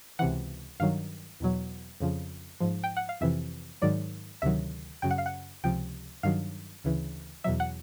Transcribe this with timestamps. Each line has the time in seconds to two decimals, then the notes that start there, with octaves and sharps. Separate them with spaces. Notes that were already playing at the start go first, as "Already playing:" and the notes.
0.19 C#2 C3 E3 F#5
0.80 G2 D#3 F#3 F5
1.40 E2 B2 F#3
2.00 F2 C#3 F3
2.60 G#2 F3
2.84 G5
2.97 F#5
3.09 F5
3.21 F2 C3 E3 E5
3.82 G#2 D#3 F#3 D5
4.42 D2 C3 D#3 F#3 E5
5.02 F#2 C#3 F#3 G5
5.11 F#5
5.18 F5
5.26 F#5
5.63 C#2 C3 F3 G5
6.23 G2 D#3 F#3 F5
6.84 D2 C#3 E3
7.44 E2 B2 F#3 E5
7.60 F#5